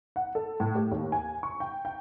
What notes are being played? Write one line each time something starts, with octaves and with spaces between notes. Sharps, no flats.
F#5
A4
A2
G4
D#2
G#5
C#6
G5
G5